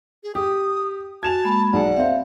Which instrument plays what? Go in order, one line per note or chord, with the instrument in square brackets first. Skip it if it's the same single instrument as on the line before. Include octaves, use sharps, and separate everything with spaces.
[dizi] G#4
[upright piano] G4 [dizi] D#6
[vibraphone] F#4 G#5 [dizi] A5 [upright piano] G#6 E7 F7
[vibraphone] G#3 A#3 B5
[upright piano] B1 G#4 A5 [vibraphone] D5 [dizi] F#5
[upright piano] C4 C5 [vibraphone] E5 F5